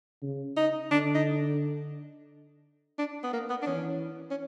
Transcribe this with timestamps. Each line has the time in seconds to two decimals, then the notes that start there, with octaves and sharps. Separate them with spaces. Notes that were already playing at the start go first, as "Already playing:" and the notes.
0.22 C#3
0.56 D#4
0.91 D3 D4
1.15 D#4
2.99 D4
3.23 B3
3.33 A#3
3.50 B3
3.62 D4
3.66 E3 C#4
4.30 C#4